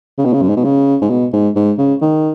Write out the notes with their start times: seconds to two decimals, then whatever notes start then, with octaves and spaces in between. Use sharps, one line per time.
0.18 C#3
0.25 B2
0.33 C#3
0.42 F#2
0.49 G#2
0.56 B2
0.64 C#3
1.02 G#2
1.10 B2
1.33 G#2
1.56 G#2
1.78 C#3
2.02 D#3